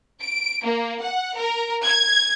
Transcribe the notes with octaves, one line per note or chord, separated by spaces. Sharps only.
D7
A#3
F#5
A#4
G#6